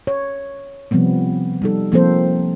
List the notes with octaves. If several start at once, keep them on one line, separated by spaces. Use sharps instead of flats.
C#5
C3 F3 G3 B3 C4
G3 D#4 A4
F3 A#3 C4 A4 C5